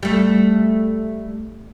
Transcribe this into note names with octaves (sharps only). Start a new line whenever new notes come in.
G3 A3